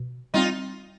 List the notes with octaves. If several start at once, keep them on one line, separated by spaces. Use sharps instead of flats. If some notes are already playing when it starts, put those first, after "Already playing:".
Already playing: B2
G3 C4 D#4 F4